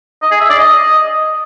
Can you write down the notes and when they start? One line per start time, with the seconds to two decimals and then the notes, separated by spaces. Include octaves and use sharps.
0.22 D#5
0.31 G#4
0.40 E5
0.50 D5
0.59 D#5